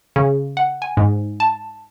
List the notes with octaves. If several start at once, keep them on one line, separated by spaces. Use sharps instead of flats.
C#3
F#5
G#5
G#2
A5